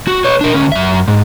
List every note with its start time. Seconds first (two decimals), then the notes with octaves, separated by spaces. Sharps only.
0.07 F#4
0.24 B4 C#5
0.41 D4 A#4
0.54 D2 C#4
0.72 F#2 E5
1.08 G#2